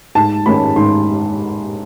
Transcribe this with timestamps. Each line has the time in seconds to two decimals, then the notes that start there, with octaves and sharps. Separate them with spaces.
0.15 G#2 A5
0.46 D#3 G#3 C#4 B5
0.76 G#2 C6